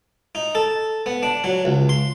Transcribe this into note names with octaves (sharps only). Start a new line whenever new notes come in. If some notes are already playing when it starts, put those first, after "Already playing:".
D#4
A4
B3
D4
F#3
C#2
C6